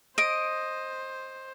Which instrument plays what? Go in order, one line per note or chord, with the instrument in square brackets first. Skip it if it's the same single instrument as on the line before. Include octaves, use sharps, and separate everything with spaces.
[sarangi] C5 [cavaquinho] D#5 [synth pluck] D7